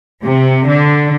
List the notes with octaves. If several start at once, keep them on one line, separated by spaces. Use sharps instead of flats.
C3
D3